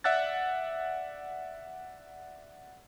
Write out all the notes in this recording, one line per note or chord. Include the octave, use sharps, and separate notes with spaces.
D5 E5 F#5 E6 F#6 A6